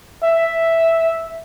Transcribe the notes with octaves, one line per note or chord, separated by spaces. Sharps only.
E5